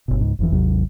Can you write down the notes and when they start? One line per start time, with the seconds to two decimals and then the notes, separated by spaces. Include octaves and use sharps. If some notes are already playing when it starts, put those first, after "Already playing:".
0.08 G1 B2
0.21 C#2 G#2
0.39 F#1 F2 E3
0.52 G#1 D#2 C3 F#3